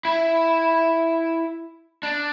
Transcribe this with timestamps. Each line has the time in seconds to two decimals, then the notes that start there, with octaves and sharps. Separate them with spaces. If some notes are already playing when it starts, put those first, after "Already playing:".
0.05 E4
2.03 D4